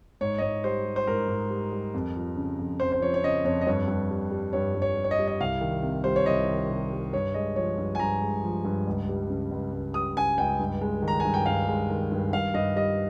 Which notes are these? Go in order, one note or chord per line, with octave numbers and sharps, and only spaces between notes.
G#2 C#5
D#5
G#2 C#5
G3 C5
G3
C5
G#2 A#4
G#2
G3
G3
F2
F3
C#3
F2
F2 C5
C5
F3 C#5
C#5
C#3 D#5
F2 C#5
D#5
G2 C#5
G2
G3
G3
G2 C#5
G2
C#5
G3
C#5
D#5
G3
D#5
C2 F5
D#3
C3
G3 C5
C#5
C2 D#5
D#3
C3
G3
G2 C#5
G#3 D#5
F3 C#5
G2
G#5
G2 A#5
G#3
F3
G2
C#2
G3
C#3
C#2
C#2
G3 D#6
C#3 G#5
C#2 G5
G2
G#3
D#3
A#5
G2 G#5
G5
G2 F5
G#3
D#3
G2
G2 F5
G2 D#5
G3 D#5